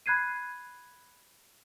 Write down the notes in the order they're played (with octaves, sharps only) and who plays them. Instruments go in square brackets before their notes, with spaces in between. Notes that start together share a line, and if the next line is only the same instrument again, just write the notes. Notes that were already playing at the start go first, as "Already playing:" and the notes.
[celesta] B5 F#6 G#6 C7 D#7